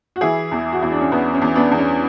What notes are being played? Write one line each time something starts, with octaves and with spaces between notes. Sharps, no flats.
F#4
E3 E4 G#4
E2
F#4
E2 E4
D4
C#4
E2 B3
C#4
E2
B3 D4
E2
C#4